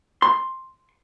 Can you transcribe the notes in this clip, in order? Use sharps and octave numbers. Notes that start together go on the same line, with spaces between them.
C6